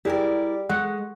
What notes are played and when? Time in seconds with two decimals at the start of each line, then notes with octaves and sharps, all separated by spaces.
0.05 G3 E4 G4 G#4 A#4 D5
0.69 G#3 F#5 C#6